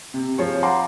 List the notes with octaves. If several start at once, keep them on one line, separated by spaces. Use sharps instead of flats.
C3
F3 G#4 C#5
F5 F#5 A#5 C6 D6